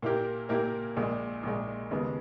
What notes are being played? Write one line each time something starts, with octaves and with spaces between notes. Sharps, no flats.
A#2 A#3 E4 G4 A#4
A#2 A#3 E4 G4 A#4
A#1 A#2 G#3
A#1 A#2 G#3
D#2 C#3 G#3 B3